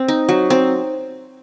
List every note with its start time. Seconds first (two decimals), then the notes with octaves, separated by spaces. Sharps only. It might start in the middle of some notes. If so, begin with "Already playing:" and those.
Already playing: C4
0.08 D#4
0.29 F#3
0.50 C4